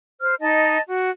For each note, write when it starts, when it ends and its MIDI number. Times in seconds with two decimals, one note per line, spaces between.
0.20 0.35 72
0.20 0.35 89
0.40 0.79 63
0.40 0.79 75
0.40 0.79 81
0.87 1.11 66